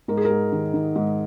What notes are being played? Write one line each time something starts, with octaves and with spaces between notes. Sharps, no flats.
G#2 A#4
G#4
A#4
G#2
D#3
D#3
G#2